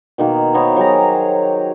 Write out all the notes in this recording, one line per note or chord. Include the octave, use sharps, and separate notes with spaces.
B2 D#3 A#3
B3 A#4 C5 C#5
F#3 G4 G#4 A#5